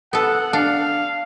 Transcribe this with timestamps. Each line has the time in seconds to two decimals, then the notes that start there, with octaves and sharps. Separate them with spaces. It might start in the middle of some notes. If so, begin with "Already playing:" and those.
0.13 B3 A4 F#5
0.53 D4 F5